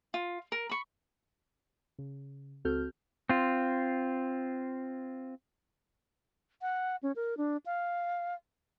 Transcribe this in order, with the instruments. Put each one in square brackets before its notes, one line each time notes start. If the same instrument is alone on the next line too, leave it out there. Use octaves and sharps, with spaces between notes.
[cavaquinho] F4
A#4
B5 C#6
[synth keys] C#3
C#2 C4 F#4 A4 F6 G6
[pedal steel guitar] C4 F4
[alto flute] F#5
C#4
A#4
D4
F5